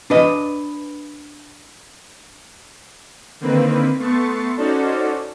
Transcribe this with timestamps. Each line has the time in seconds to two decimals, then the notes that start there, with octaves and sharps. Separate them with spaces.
0.10 D4 B4 D#5
3.41 D3 D#3 A#3 C4 B4
3.99 A3 B3 C6 C#6 A6 C#7
4.57 C#4 D#4 F#4 A4 C5 D5